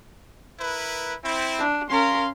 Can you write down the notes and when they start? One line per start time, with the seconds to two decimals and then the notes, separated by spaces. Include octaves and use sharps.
0.59 E4 A#4 B4
1.24 C4 E4
1.59 D4
1.89 C#4 A#4 F5 C6